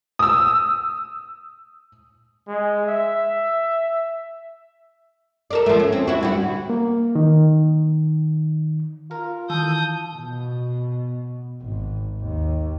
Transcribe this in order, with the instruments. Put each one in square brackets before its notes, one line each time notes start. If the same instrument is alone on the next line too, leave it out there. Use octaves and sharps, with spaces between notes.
[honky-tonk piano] D#6 E6
[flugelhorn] G#3
E5
[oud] A4 A#4 D5
F3 A3
C#4
C4
E4 F#4
D2 G3 F#4
[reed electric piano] A#3
D#3
[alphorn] F4 [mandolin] A#4
[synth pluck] D#3 E3 [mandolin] A4 [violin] D#6 G6
[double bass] B2
G#1
D#2